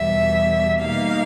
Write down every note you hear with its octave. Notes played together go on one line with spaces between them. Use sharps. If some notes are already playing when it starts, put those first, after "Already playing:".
Already playing: E2 B2 G3 E5
B2 G3 A#3 D#4 F5